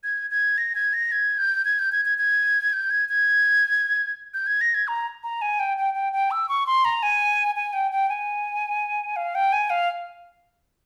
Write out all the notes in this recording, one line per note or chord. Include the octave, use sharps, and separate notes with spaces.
G#6
G#6
A#6
G#6
A#6
G#6
G6
G#6
G6
G#6
G#6
G#6
G6
G#6
G#6
G6
G#6
A#6
G#6
A#5
A#5
G#5
G5
G5
G5
G5
E6
C#6
C6
A#5
G#5
G#5
G5
G5
G#5
F5
G5
G#5
F5